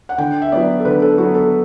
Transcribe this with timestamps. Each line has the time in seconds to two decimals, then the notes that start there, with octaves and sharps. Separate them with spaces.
0.09 F#5
0.18 D3 G5
0.42 E5
0.52 F#3 B3 D5
0.80 A4
0.85 D3 B4
1.02 A4
1.18 F#3 B3 F#4
1.35 A4